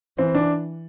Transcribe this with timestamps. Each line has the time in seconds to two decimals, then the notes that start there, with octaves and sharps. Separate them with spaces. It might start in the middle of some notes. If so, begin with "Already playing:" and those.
0.18 E3 C4
0.35 D4